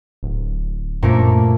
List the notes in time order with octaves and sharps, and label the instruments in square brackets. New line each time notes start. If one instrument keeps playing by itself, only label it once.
[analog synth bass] D1
[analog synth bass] F#2 [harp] A#2 A3 A#3